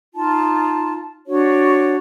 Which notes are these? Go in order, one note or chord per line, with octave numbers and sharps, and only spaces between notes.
D#4 F4 A5
D4 F#4 C#5